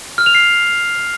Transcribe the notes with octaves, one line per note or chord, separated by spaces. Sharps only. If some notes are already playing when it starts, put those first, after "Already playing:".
F6
F7
C7